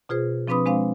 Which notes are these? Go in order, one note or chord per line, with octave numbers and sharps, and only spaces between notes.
B2 F4 G#4 C5
F3 C4 D4 B4 B5 D#6
G#3 C4 D4 C5 F5